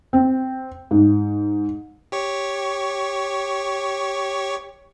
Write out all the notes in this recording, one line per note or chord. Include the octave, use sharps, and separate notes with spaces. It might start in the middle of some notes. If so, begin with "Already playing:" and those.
C4
G#2
G4 C#5 C#6